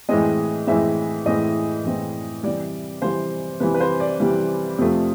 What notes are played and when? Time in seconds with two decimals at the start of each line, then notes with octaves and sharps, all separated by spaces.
0.09 A2 E3 G#3 C4 D#5
0.67 A2 E3 G#3 C4 E5
1.26 A2 E3 G#3 C4 D#5
1.84 A2 E3 G#3 C4
2.43 C3 E3 G3 D5
3.02 C3 E3 G3 C5
3.60 C3 E3 G3 B4
3.74 B4
3.80 C5
4.00 D5
4.20 C3 E3 G3
4.78 F2 C3 F3 A3